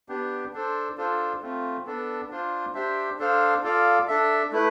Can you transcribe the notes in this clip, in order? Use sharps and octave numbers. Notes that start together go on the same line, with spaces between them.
B3 D4 G4
D4 A4 C5
D4 F4 A4 C5
A3 C4 F4
B3 D4 A4
D4 F4 C5
D4 G4 C5 E5
D4 A4 C5 F5
F4 A4 D5 F5
D4 A4 E5
A3 E4 B4